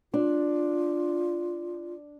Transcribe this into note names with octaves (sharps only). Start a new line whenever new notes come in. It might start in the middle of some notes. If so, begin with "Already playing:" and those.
D4 F4